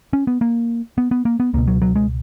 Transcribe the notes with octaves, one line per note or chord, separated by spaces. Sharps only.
C#4
B3
A#3
B3
B3
A#3
B3
C#2 B2 A#3
F#3
F#3
G#3